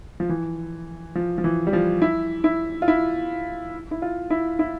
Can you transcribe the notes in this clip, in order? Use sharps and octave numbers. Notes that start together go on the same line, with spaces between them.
F3
E3
F3
F3
E3
G3
F3
E4
E4
F4
E4
E4
F4
E4
E4